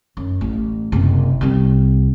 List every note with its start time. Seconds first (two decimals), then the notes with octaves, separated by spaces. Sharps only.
0.17 F#2
0.41 A1
0.92 F#1 C3
1.41 C2 C4